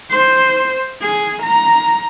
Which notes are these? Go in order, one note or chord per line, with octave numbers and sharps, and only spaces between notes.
C5
G#4
A#5